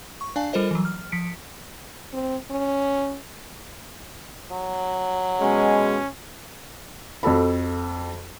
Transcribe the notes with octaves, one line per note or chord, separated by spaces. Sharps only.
C#6
D4 D5 F5 G#5 A5
G3 F4 A4 A#4 C5 D#5
E3 F#3
F6
F3 B6 C#7 D7
C4
C#4
F#3
B2 G#3 C#4
F2 F#4 A4 B5